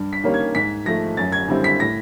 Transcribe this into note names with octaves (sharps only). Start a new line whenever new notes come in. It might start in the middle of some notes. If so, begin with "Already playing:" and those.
Already playing: G2
B6
D#3 G3 A#3 C#4
G#6
G#2 B6
F3 A3 A#6
F#2 A6
G#6
D3 G3 C4 E4
B6
A2 A#6